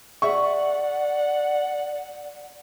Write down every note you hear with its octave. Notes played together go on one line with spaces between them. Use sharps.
G#4 D5 E5 F#5 C#6